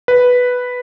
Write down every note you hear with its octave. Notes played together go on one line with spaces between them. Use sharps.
B4